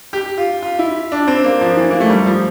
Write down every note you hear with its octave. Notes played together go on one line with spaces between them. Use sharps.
G4
F4
F4
E4
D4
C4
A#3
F3
E3
A#3
A3
G3
F3